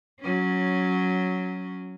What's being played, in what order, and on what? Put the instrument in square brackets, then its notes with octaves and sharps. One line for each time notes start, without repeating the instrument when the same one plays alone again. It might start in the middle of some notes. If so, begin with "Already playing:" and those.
[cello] F#3 C#4